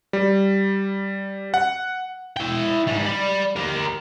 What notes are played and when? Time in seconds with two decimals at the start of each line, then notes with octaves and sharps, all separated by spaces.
0.13 G3
1.54 F#5
2.36 E4 G5
2.87 G#2 G3
3.06 D5 B5
3.56 G4 A#4